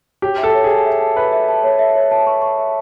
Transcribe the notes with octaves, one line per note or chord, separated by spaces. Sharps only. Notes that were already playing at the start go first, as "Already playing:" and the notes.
G4 C#5
E5
A4
C#5
G#4
A5
E5
A5
B4 E5
E5
A5
C#5
E5
C#5
A5
C#6
C#6
E5